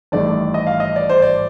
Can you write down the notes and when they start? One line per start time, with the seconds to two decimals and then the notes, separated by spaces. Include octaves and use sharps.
0.12 A1 G2 D#3 A3 D5
0.54 D#5
0.67 F5
0.80 D#5
0.96 D5
1.09 C5
1.22 D5